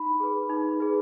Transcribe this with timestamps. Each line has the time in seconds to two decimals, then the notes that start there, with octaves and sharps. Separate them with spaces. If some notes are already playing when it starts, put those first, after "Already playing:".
Already playing: D#4 B5
0.20 G#4 B4
0.50 D#4
0.80 G#4 B4